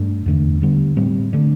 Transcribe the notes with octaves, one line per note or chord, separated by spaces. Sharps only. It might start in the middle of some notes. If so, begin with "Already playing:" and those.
Already playing: G2 A3 D4
E2 D3 A3
D3 G3 B3
A2 G3 C4
D3 A3 D4